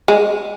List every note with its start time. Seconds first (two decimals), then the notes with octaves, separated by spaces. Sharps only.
0.08 G#3